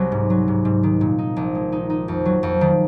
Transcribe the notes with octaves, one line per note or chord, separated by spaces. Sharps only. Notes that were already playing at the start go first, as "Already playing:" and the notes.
Already playing: C2 F#3 C4
G#2
F#3
G#2
G#2
D#3
A#2
D#4
A#1
G#3
D#4
D#4
F2
F#3
F2
D#3